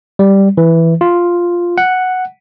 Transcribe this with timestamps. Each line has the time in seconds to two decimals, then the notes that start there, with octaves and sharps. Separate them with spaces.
0.19 G3
0.57 E3
1.01 F4
1.78 F#5